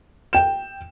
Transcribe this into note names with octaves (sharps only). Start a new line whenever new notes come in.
G5 E7